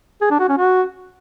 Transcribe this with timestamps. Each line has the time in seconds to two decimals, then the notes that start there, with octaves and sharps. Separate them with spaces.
0.21 G#4
0.30 D4
0.40 F#4
0.49 C#4
0.58 F#4